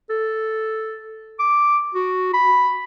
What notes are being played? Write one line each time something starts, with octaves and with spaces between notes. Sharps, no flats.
A4
D6
F#4
B5